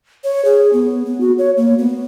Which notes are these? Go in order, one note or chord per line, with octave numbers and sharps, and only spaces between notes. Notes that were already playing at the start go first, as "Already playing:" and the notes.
C#5
G#4
B3
B3
F#4
C#5
A#3
B3